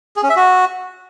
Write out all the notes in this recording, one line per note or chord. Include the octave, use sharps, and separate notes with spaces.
G#4
C#4
E5
F#4